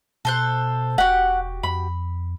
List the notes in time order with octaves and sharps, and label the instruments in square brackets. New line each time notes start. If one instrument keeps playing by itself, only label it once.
[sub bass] B2 [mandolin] A4 C5 F#6
[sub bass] E1 [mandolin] F#4 G4 [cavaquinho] F#5
[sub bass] F2 [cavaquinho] B5